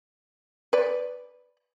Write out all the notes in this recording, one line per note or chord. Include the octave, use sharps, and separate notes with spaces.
B4 D5